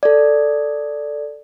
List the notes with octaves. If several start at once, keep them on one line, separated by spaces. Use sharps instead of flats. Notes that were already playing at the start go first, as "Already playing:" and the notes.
A4 D5